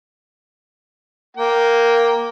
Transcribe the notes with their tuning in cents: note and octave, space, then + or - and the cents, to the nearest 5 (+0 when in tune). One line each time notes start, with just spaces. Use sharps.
A#3 +0 G5 -15